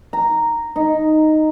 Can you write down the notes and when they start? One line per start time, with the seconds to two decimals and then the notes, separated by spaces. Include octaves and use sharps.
0.13 A#5
0.76 D#4